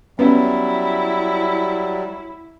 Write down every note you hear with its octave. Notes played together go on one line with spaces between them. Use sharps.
F#3 G3 B3 C#4 E4 B4